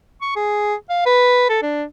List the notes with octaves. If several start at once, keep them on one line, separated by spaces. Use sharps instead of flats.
C#6
G#4
F5
B4
A4
D4